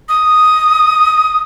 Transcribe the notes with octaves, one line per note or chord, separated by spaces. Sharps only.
D#6